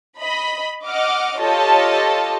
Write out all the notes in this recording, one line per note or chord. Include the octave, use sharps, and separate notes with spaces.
D#5 B5
D#5 F#5 D6 F6
F4 G4 A4 C#5 D#5 A5